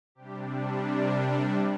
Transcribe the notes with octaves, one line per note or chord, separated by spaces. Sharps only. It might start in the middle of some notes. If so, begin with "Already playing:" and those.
C3 G3 D4 G4
A#4